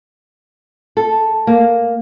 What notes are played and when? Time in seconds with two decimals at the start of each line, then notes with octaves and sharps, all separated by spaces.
0.97 A4
1.47 A#3